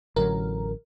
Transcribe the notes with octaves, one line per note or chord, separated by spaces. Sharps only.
A1 D3 F#3 A#4